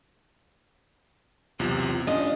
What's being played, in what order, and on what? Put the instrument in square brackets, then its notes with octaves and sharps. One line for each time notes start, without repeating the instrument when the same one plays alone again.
[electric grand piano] B1 E2 C3 [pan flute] F4
[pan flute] C#4 [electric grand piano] D4 F4 [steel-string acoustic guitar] D#5